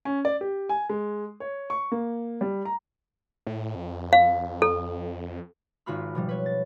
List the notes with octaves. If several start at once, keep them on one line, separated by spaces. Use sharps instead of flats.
C#4
D5
G4
G#5
G#3
C#5
C#6
A#3
G3
A#5
A2
F2
F5
A4
G#1 F4 F#4 B5 F6
B2 F3 G3
B4 C#5
A6